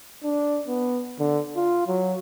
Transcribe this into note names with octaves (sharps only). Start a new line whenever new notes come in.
D4
B3
D3
F4
F#3